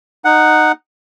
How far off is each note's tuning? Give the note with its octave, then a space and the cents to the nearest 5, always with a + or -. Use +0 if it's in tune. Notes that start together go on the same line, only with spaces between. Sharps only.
D#4 -15 F#5 +0